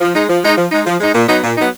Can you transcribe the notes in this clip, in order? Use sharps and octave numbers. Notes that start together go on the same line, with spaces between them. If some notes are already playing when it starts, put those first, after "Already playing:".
F3
G#3 D#4
F3
G#3 D#4
F3
G#3 D#4
F3
G#3 D#4
A#2
F#3 B3 D#4
A#2
F#3 B3 D#4